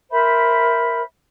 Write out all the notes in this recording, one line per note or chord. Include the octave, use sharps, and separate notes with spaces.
A#4 C5 E5 B5